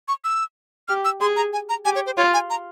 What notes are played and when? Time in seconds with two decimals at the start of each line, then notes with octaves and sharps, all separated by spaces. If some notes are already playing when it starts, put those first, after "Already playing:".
0.08 C#6
0.24 E6
0.88 G4 F6
1.05 E6
1.21 G#4 C6
1.36 A#5
1.53 G#5
1.69 A#5
1.85 G4 G#5
1.95 C#5
2.06 C5
2.17 F4 C#5
2.34 G#5
2.50 A#5